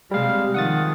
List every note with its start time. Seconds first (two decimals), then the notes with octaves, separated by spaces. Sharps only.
0.11 C3 G3 G#3 F5
0.54 D#3 F3 F#5 D#6 A6